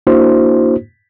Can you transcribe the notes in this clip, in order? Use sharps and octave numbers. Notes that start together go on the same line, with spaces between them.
A#3 D4 E4 F#4 C5